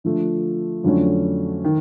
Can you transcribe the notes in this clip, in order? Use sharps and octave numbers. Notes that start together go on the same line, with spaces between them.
D3 F3 A3
F2 D3 F#3 A3 C#4
D#3